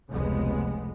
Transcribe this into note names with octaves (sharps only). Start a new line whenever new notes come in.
F1 C#2 G#3 B3